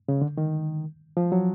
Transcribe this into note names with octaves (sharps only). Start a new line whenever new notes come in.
C#3
D3
D#3
F3
F#3